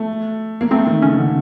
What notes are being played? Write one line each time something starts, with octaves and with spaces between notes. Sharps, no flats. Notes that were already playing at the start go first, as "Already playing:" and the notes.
Already playing: A3
A#3
A3 C4
D#3
C#3 C#4
D#3
D3